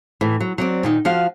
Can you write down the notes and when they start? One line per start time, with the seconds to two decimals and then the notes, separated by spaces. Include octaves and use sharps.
0.21 A2 E3
0.40 F#3
0.58 F#3 C4 D5
0.83 A#2 D#3 D#4
1.05 F3 F#4 F5